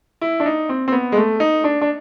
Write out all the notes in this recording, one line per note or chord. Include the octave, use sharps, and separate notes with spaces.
E4
D4
D#4
C4
C4
B3
G#3
A3
D#4
D4
D4